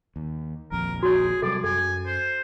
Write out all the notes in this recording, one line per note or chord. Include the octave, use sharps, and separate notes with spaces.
D#2
D#1 A#1 F2 A#4
F#4 G#4 C#5
C3 F#3 G3 A4 D5
F#2 A4 G#5
C5